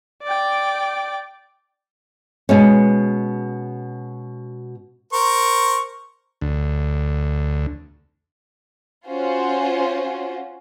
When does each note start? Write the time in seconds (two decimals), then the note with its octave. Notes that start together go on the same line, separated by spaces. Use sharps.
0.23 D5 G5
2.49 B2 G#3 C#4
5.13 A#4 C5 C#6
6.41 D2
9.07 C#4 F4 F#4 C5